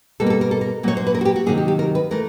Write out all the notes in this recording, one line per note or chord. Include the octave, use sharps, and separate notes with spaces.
B2 G3 A#3 A4
A#4
A4
A#4
A4
A#4
A#2 F#3 A#3 C#5
C5
B4
A#4
F#4
G4
F#4
C3 D#3 F#3 A#3 G#4
G4
G4
A#4
B4
E3 A3 A#4